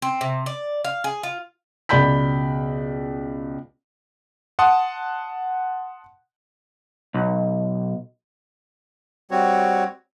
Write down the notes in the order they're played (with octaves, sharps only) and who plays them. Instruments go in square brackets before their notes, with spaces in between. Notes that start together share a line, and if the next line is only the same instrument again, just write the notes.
[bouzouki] C4
C3
D5
F5
G#4
F4
[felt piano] C#2 B2 D5 B5 G6 B6
[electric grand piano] F#5 A5 C6 D#6
[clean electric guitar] B1
[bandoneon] G3 C4 F#4 C#5